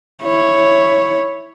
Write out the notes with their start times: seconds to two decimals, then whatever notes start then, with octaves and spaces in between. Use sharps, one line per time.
0.24 E4 C#5